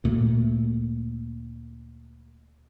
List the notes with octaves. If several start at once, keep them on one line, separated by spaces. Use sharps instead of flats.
D2 A#2 A3